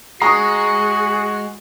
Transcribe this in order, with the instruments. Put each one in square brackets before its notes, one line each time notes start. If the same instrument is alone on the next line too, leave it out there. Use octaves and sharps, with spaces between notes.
[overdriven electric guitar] G#3 [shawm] F#4 [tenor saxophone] G#4 [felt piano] A#5 C#6 D#6